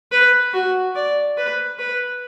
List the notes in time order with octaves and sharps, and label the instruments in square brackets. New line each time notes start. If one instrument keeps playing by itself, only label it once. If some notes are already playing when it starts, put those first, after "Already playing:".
[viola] B4
F#4
D5
B4
B4